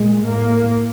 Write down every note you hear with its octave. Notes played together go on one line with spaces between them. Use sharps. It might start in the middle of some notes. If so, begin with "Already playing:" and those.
Already playing: A#2 G#3
A2 A#3